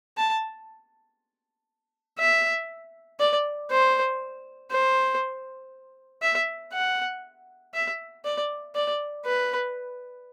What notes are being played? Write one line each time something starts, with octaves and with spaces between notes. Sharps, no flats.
A5
E5
D5
C5
C5
E5
F#5
E5
D5
D5
B4